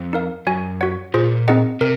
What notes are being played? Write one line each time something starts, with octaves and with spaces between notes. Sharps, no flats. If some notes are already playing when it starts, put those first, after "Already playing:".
Already playing: F2
D#4 A#4 F5
F#2 F#4 C#5 G#5
F#4 C#5 F#5
A#2 F4 G#4 C5
C4 D#4 G#4 D#5 F#5
C3 A#4